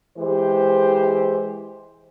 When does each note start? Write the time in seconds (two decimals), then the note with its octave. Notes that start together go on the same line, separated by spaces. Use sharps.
0.17 E3 G#3 G4 C5